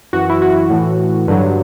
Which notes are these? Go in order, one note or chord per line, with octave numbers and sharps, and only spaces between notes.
F#2 E3 F#4
E4
F#4
A2 E3
G2 D3 F#3